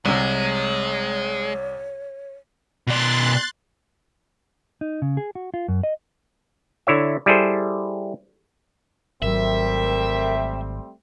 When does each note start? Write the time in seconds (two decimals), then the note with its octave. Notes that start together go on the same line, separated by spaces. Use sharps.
0.06 C2 C3 G#3 C#5
2.87 B2 D5 C6 F#6 A6
4.81 D#4
5.02 C#3
5.17 G#4
5.35 F#4
5.54 F4
5.68 F#2
5.83 D#5
6.87 D3 E4 C#5 E5
7.26 G3 E4 G#4 A4 C5
9.22 G#1 F#3 G3 A3 C4 A#4 E5